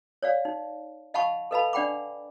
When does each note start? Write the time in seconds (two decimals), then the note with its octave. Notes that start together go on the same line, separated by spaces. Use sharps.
0.23 C#5 D5 F5
0.45 D#4
1.14 D#5 F5 F#5 A5 B5 C#6
1.51 A4 B4 D#5 F5 A5 B5
1.73 D4 D5 F#5 G5 B5 D6